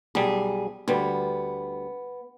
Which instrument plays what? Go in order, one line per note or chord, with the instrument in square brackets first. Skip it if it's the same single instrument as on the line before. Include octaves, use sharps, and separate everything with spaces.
[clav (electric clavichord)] B1 G3 [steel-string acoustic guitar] G#4
[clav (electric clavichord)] D2 G3 [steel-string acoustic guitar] B3